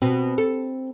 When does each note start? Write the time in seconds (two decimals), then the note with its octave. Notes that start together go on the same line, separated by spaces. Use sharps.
0.02 B2 C4
0.38 A4